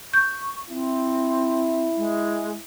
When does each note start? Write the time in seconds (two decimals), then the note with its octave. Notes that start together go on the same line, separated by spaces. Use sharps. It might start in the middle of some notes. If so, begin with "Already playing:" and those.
0.14 C#6 G6
0.69 C4 E4
1.97 G#3